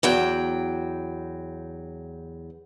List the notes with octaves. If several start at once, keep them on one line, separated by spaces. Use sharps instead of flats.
E2 F#3 G5